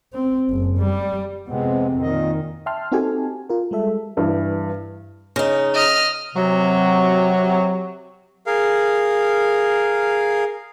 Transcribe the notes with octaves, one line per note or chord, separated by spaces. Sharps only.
C4
F#1
G3
F2 C3 G#3 B3 C4
A#2 D#3 D#5
E5 G5 A5 C6 F6
C4 D#4 F#4 G4 A4 G#5
F4 A#4
G3 G#3 A4 E5
G2 E3
C#3 D#4
D#5 F6
C3 F#3
G#4 A#4 F5